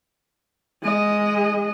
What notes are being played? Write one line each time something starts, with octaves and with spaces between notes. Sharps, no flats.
G#3 D#5